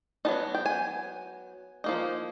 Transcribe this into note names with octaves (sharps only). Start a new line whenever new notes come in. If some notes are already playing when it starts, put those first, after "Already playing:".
F#3 B3 D#4 A5
G5
G#5
F3 A#3 D#4